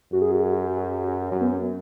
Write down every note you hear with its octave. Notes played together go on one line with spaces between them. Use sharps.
F#2 F#4
G#4
F#4
G#4
F#4
G#4
F#4
G#4
F#4
G#4
F#4
F#2
B3
C#4